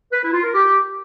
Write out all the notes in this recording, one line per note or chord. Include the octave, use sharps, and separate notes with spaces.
B4
E4
F4
A#4
G4